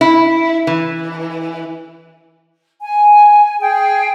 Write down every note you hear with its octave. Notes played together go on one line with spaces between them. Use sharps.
E4
E3
G#5
G#4 G5